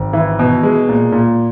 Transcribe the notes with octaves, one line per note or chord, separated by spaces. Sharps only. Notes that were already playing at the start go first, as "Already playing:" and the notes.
Already playing: G#1
E3
B2
G#3
A#2
A#2